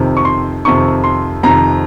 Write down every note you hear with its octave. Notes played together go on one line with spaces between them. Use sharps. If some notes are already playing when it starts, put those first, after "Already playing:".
Already playing: F2 C3 D#3
C#6
C6
F2 C3 D#3 C#6
C6
F2 C3 D#3 A#5